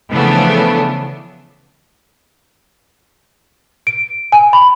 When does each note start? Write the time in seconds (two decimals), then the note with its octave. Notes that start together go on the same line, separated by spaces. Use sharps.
0.11 C#3 E3 F3 A3 B3 D4
3.87 D7
4.32 G#5
4.53 B5